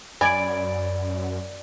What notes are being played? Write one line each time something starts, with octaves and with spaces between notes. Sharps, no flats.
F#2 D5 G#5 B5 G#6 D7